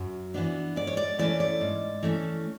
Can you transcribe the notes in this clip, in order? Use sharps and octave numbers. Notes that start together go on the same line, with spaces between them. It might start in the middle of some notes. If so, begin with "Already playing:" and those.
Already playing: F#2 F#4
E3 B3 D4
G#2 D5
C#5
D5
E3 A3 C#4 D5
D5
G#2
E3 A3 C#4